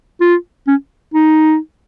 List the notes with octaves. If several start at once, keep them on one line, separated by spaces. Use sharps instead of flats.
F4
C#4
D#4